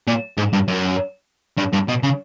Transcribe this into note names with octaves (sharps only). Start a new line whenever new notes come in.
A#2
G#2
G2
F#2
G2
G2
B2
C#3